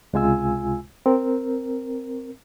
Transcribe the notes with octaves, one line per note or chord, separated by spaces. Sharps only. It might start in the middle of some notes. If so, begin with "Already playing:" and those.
C#2 C3 G#3 F4 G#5 E6
C4 A#4